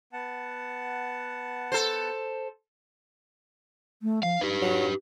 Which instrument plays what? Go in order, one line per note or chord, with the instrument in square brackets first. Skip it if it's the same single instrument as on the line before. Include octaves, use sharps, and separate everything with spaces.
[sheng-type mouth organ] B3 F#5 A5
[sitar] A4 C5
[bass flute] A3
[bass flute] F3 [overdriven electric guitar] F5
[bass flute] D#4 [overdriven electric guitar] G4 B4
[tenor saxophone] F#3